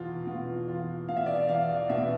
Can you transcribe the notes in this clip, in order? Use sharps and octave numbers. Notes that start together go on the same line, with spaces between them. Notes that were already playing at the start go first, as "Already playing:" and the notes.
Already playing: E2 B2 F4
B2 F4
E2 F4
B2 F5
E5
D5
E5
E2 F5
B2 E5